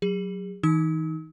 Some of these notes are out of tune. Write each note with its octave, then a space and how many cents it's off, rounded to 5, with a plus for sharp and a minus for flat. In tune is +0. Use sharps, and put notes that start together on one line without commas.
F#3 +0 G#4 -40
E3 -40 D#4 +10 E6 -45